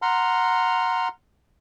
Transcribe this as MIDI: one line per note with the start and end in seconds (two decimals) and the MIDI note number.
0.02 1.08 78
0.02 1.08 82
0.02 1.08 84
0.02 1.08 89